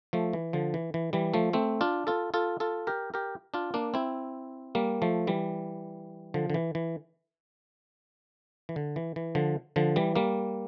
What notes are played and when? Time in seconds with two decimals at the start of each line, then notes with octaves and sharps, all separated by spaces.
0.13 F3 A3
0.33 E3
0.53 D3 F3
0.74 E3
0.94 E3
1.13 E3 G3
1.34 F3 A3
1.53 A3 C4
1.81 D4 F4
2.07 F4 A4
2.34 F4 A4
2.60 F4 A4
2.87 G4 A#4
3.14 G4 A#4
3.54 D4 F4
3.74 A#3 D4
3.94 C4 E4
4.75 G3 A#3
5.02 F3 A3
5.27 E3 G3
6.34 D3 F3
6.50 D3
6.54 E3
6.75 E3
8.69 E3
8.76 D3
8.96 E3
9.16 E3
9.35 D3 F3
9.76 D3 F3
9.96 E3 G3
10.16 G3 A#3